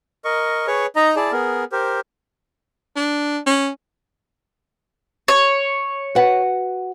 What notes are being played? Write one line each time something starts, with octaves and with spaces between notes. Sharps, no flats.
A#4 D#5 C#6
G#4 B4 C#5 C#6
D#4 D#5 A#5
E4 G#4 D5 A5
B3 G#4 A#4
G4 A#4 C5
D4
C#4
C#5
F#4 B4 F#5